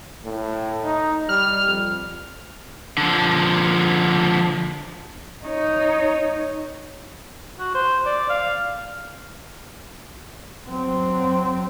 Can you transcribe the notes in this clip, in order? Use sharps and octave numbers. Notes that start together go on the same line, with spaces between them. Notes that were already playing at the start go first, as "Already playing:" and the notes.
A2
D#4
G3 F6
F2
D3 F3
D#4 C#5
F#4
C5
D5
F5
F#3 C4